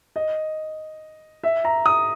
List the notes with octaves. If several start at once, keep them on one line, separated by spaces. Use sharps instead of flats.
D#5
E5
A#5
D#6